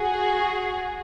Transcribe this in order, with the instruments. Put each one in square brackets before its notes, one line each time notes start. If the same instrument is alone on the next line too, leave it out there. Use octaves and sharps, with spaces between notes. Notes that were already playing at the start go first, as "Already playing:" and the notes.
Already playing: [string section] F#4 G#4